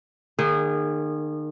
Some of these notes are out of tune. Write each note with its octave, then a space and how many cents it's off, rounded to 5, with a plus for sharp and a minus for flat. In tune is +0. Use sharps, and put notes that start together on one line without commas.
D#3 -35 A#3 +0 G#4 -25